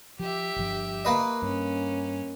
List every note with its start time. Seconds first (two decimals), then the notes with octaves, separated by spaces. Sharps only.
0.19 F3 G4 E5
0.56 G1 D3 F3
1.05 A#3 B4 D#5
1.42 G2 C#4